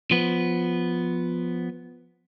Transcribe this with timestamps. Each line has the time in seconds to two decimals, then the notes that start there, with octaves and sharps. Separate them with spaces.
0.11 F3 B3